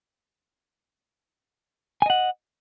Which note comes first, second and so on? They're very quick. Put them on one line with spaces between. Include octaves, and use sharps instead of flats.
G#5 D#5 F#5